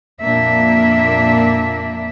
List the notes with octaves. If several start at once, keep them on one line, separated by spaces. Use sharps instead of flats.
F2 A#2 A#3 D4 E5